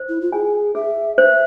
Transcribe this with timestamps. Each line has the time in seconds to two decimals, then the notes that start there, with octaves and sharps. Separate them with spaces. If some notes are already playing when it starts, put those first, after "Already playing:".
Already playing: C5
0.09 E4
0.21 F4
0.32 G#4 G#5
0.75 G#4 E5
1.18 C5 E5